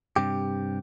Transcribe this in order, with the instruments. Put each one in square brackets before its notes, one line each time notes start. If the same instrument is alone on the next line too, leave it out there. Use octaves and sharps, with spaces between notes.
[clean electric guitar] G2 C3 G4